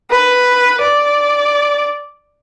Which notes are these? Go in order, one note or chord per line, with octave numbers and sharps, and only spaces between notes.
B4
D5